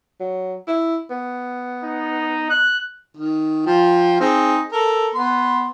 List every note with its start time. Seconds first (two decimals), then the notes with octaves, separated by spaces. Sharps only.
0.20 F#3
0.67 E4
1.10 B3
1.84 D#4
2.50 F#6
3.17 D#3
3.66 F3 F4 G5
4.20 C4 D#4 G#4
4.72 A4 A#4
5.15 B3 B4 C6